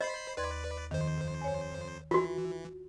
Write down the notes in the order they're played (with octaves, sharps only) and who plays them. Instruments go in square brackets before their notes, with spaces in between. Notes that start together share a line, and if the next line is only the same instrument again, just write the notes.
[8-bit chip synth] C5 B5 C7 [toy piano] D#5
[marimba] D#2 C6 G#6 [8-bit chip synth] B4 D5
[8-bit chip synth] F2 C5 [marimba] D#3
[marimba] C#5 G#5
[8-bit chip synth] E3 [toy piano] F4 F#4